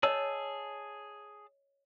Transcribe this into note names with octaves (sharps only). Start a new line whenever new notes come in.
G#4 C#5 D#5 A5 E6